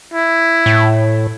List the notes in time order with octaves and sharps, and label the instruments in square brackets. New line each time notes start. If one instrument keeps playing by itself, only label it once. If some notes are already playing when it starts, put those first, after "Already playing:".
[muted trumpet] E4
[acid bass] A2